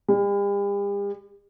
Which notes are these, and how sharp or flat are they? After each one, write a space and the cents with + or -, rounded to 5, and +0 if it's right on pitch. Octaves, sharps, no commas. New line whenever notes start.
G3 +45